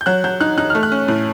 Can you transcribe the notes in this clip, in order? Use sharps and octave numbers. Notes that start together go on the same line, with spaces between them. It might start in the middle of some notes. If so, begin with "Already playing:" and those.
G6
F#3 F#6
F#3 G6
D#4 F#6
D#4 F#6
A3 F6
F#6
C#4
A2